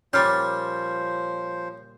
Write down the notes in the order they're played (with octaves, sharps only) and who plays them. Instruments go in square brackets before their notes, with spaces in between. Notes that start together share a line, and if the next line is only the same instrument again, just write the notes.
[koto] A#2 G3 [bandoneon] F3 C5 [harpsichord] C#4 [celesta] F6 G6